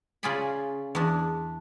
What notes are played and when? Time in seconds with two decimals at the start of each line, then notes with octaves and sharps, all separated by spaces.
0.23 C#3 C#4 F4 G#4 D5 B5
0.95 E2 D4